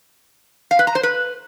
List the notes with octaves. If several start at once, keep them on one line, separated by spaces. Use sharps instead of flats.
F5
B4
A#5
C5
B4